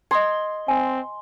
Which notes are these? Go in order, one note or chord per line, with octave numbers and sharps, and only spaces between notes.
D#5 C6 D#6 G#6
C4 G#5